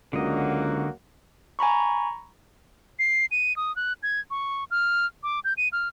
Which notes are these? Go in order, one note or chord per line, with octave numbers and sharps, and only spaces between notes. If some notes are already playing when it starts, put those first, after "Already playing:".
C#2 D3 F#3 A#3 F#4 D#5
G#5 A#5 B5 C#6
C7
D#7
D#6
F#6
G#6
C#6
F6
D6
G6
D#7
F6